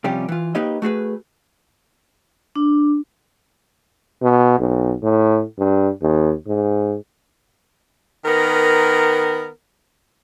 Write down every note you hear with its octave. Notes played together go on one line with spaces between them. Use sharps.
C3 F3 G3 C#4 F4 G4
E3 F4
A#3 D#4 G4 B4 C#5 D#5
A3 F#4 G#4 B4
D4
B2
B1
A2
G2
D#2
G#2
D#3 B3 A#4